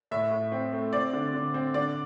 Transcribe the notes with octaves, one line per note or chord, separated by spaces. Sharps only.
A2 E5
A2
C4
A3
C4 D5
D3
D3
C4
D3 D5